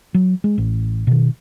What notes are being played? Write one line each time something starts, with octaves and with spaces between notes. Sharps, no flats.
F#3
G#3
A1
B2 D#3